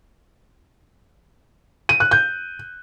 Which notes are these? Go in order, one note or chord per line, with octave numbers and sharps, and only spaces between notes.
D#7
F#6
G6